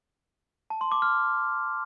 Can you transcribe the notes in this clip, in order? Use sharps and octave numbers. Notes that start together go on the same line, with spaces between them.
A5
C6
D6
F6